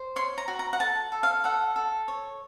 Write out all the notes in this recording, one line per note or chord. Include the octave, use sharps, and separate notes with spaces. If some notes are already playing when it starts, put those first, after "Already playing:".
Already playing: C5
C#5 C6
A#5
F#4
A#5
F#5
A4 A5
A4
F5
A4 F#5
A4
C#5